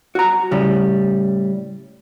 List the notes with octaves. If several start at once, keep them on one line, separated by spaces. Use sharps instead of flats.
F#4 A#5
A2 C#3 G3